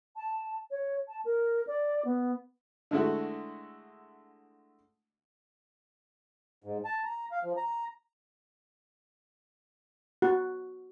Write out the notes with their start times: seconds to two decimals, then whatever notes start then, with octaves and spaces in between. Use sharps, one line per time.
0.16 A5
0.71 C#5
1.08 A5
1.25 A#4
1.67 D5
2.05 B3
2.91 D3 G#3 A3 E4 F#4
6.64 G#2
6.85 A5
7.05 A#5
7.32 F5
7.44 F3
7.57 A#5
10.22 F#4